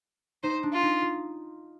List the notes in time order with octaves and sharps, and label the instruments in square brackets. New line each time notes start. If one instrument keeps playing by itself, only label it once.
[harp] D#4 [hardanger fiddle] C5
[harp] D4
[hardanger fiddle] F4
[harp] D#4
F4